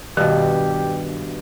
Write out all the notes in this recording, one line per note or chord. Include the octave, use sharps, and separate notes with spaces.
G2 B2 D#3 G4